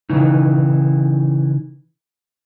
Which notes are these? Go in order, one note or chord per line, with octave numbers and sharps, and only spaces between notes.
C#3 E3 D#4